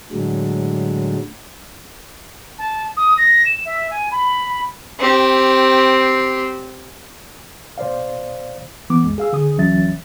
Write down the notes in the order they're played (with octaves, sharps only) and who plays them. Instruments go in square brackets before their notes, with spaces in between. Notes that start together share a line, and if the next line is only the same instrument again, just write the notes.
[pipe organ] A2 D3 F#3 G#3
[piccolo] A5
D#6
A#6
E7
E5
G#5
B5
[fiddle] C4 G4
[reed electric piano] B2 C5 D5 F5
E3 B3 D6
C2 F#2 G#3
G#4 F5 E6
D3 G#4 D#6
C#2 E3 F#3 C#4 E5 A6